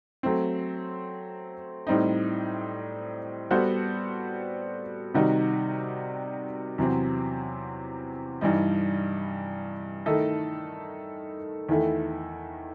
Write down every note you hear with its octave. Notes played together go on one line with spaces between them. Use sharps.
F#3 A3 C4
A2 G3 C4 D#4
G3 B3 F#4 A4 C5
C3 D#3 G3 D#4 F#4
E2 C3 F#3 C4
G2 E3 G3 D#4
D#3 A3 E4 A4 D#5
E2 D#3 A3 E4 A4